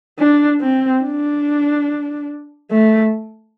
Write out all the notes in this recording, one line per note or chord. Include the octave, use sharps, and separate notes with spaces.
D4
C4
D4
A3